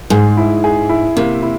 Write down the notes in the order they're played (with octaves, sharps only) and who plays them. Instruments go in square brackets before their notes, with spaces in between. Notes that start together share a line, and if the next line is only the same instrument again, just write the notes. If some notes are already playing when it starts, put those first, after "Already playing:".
[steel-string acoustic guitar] G#2 [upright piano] G#4
[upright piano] E4
G#4
E4
[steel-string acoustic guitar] C3 [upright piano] A#3
[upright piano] E4